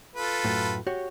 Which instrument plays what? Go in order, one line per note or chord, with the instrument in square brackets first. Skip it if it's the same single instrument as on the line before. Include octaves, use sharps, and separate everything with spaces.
[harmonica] F4 A4 B4
[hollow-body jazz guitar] F#2 A2
F#4 G4 C#5